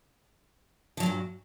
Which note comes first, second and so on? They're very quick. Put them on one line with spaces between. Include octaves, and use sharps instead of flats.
F3 F#3 G2 A#2